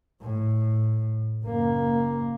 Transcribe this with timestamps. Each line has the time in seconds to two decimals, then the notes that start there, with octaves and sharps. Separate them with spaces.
0.22 A2
1.45 F#1 A#3